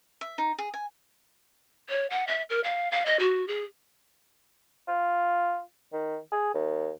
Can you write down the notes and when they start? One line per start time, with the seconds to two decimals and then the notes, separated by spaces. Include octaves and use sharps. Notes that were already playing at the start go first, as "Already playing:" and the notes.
0.21 E5
0.38 D#4
0.59 G#4
0.74 G#5
1.89 C#5
2.10 F#5
2.27 E5
2.50 A#4
2.64 F5
2.91 F5
3.06 D#5
3.19 F#4
3.48 G#4
4.88 F4
5.93 D#3
6.32 G#4
6.55 D#2